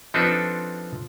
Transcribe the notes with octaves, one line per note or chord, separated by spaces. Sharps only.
F3 C4 D4 D#4 A4 B4